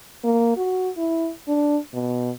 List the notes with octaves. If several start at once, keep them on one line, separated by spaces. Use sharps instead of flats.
A#3
F#4
E4
D4
B2